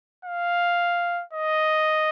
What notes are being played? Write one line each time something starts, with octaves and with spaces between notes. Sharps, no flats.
F5
D#5